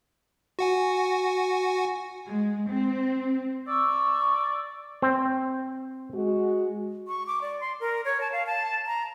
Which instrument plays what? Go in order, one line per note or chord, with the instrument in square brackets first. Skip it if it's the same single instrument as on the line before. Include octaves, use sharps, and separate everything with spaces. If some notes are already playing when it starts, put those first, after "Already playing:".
[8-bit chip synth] F#4 F#5 G#5
[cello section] G#3
C4
[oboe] D5 [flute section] C#6 E6
[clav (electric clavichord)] C4
[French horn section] G#3 F#4
[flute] C#6
D6
D5
C6
A#4
C#5
A5
F5
A5
A#5